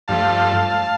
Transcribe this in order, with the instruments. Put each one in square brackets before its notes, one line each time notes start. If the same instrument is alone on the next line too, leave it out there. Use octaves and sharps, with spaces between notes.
[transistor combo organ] G2 F3 A3 F5 A5